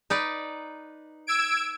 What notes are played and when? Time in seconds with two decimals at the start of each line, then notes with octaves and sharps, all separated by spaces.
0.10 D#4 B4 D5
1.27 E6 G#6 D7